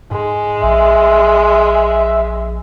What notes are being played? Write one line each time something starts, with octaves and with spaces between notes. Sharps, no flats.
G#2 G#3
A#1 E5